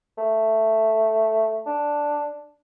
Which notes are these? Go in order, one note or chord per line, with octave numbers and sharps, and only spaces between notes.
A3
D4